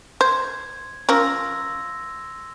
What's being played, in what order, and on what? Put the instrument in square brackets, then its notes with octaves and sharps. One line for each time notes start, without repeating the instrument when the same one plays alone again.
[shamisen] C5 [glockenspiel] G#6
[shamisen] F3 C#4 A#4 [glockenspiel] C6 E6 A#6